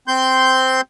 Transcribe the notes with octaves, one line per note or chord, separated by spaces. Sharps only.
C4 C6 G6